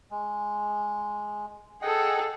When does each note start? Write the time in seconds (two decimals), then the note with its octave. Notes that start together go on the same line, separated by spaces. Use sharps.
0.11 G#3
1.82 G#4 A4 D#5 F#5 G5